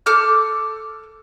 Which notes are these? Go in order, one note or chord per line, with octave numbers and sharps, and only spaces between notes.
A4 D6 F6 G6